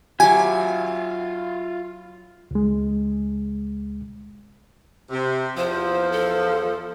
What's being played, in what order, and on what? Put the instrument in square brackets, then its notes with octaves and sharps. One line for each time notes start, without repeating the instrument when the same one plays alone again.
[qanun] F#3 G4 [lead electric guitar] F4 E5 [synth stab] G#5
[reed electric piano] C#2 G#3
[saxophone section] C3
[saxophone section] E2 F3 [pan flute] C5
[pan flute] A4